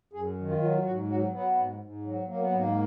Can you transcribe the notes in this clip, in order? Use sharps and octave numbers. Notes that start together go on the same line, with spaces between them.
F#2 G#4
D#3
F4
F#3 F4
F4
G#2 F#4
F#3 F#4
F#3 B3
G#2
G#2
F#3
F#3 A#3
B3
G#2 A#3